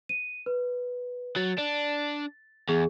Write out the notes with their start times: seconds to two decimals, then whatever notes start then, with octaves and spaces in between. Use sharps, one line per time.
0.09 D#7
0.46 B4
1.36 F#3 A6
1.58 D4
2.69 E2 G#4